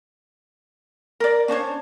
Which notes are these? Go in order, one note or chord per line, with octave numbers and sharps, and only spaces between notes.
A#4 D5
C#4 D4 C5 C#5